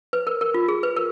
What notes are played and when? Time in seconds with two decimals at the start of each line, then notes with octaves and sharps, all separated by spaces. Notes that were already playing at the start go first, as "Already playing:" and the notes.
0.13 B4
0.27 A#4
0.41 A#4
0.54 F4
0.68 G#4
0.83 B4
0.96 A#4